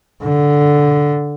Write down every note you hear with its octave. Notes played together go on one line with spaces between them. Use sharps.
D3